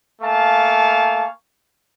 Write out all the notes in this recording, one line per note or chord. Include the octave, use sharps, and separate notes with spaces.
A3 A#3 F5 G#5 A5 C#6